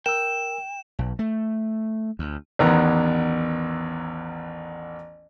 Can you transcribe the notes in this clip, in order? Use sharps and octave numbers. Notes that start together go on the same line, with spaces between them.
A#4 G5 E6 E7
B1
A3
D2
A1 E2 D#3 B3 A#5